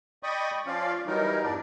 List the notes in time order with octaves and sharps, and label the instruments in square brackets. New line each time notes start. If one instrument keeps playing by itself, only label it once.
[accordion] D5 D#5 G5 B5 C#6 D#6
F3 C#4 F4 D5 F5
E3 F#3 G3 D#4 A#4
E2 G2 D4 D5